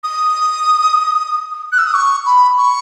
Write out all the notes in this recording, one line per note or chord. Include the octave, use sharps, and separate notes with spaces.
D#6
F#6
E6
D#6
C#6
B5
C#6